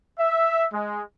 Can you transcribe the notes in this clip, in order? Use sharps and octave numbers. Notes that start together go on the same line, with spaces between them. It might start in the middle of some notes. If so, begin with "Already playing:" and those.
E5
G#3